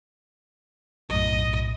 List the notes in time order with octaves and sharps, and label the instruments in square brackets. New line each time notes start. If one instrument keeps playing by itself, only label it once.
[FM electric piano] B1 F#2 A2 [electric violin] D#5